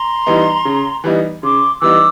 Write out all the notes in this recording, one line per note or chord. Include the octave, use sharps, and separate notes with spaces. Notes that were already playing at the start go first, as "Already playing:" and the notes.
Already playing: A#5 C6
E3 G3 B3 D#4
C#3
E3 G3 B3 D#4
C#3 C6 D6
E3 G3 B3 D#4 D6 E6